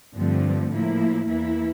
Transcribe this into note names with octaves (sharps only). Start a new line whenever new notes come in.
G2 D3 F3 A3 C4
A2 F3 A#3 E4
E2 E3 A#3 E4